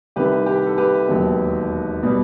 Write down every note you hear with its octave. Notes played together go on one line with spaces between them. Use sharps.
C2 C3 D#3 G4 B4
G4 B4
A4
G4 B4
E1 D#2 D#3 F#3 B3
B2 G3